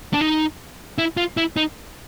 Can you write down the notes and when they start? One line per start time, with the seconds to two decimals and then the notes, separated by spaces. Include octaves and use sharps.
0.13 D4
0.21 D#4
0.98 E4
1.17 F4
1.37 E4
1.57 D#4